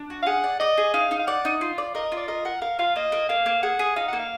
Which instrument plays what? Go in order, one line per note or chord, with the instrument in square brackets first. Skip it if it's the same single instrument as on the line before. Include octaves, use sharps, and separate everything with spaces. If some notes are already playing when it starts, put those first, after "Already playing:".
Already playing: [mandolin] D4
F#4
[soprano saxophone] F5
[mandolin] G#4 [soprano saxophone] F#5
[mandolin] D5
[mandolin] D5 [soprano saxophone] D#5
[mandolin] G#4
[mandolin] D#4 [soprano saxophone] F5
[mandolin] D#4
[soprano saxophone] F5
[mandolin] D5 [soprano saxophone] F#5
[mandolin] D#4
F4
D5
[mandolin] A#4 [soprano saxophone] D#5
[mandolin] F4
[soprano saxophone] D5
[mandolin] A#4 [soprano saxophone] D#5
[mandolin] A#4 [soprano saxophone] F#5
[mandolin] A#4 [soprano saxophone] F5
[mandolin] F4 [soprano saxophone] F5
[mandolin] A#3 [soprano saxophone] D#5
[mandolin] A#3
[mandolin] A#3 [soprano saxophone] F5
[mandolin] A#3
[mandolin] G#4 [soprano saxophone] F#5
[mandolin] G#4
[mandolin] D#4 [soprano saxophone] F5
[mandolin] A#3 [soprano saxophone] F#5
[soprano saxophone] F5